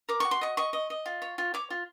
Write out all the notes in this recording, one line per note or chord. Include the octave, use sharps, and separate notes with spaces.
A#4 D6
F#4 C#6
C6
D#5 C#6
D#5 C#6
D#5
D#5
F4
C#5
F4
C#5 D6
F4